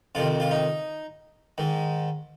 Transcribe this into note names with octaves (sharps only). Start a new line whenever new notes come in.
F2 C3 D#3 F4
F4
D#4
G#2 D#3